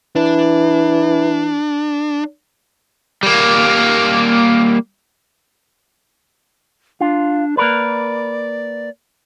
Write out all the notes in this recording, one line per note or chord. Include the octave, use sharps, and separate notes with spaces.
E3 D4
G3 A#3
D4 F4
A#3 A#4 B4 D5